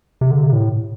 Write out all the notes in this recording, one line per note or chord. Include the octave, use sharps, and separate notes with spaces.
C3
D3
C3
A2